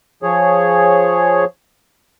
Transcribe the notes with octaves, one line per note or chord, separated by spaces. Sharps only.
F3 G#4 C#5